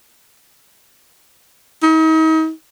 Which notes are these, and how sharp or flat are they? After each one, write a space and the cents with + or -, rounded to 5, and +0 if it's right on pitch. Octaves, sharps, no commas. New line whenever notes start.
D#4 +40